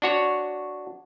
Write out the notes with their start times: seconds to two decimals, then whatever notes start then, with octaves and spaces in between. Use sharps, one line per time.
0.02 D4 F#4 C#5